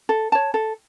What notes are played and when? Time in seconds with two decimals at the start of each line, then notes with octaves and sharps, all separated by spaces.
0.09 A4
0.32 C#5 A5
0.54 A4